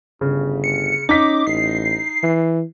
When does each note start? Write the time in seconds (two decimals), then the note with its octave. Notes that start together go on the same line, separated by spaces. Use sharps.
0.21 G1 C#3
0.64 C#7
1.09 C#4 D#4 D6 B6
1.47 A1 C7
2.23 E3